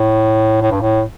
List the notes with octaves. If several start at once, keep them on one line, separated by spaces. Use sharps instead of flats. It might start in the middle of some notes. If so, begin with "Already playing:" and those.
Already playing: A2
A2
G2
A2